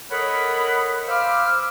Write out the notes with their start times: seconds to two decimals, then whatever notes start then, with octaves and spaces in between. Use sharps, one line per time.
0.10 A4 A#4 C#5 D#5 F#5 B5
1.07 C5 F5 B5 D6 E6 F6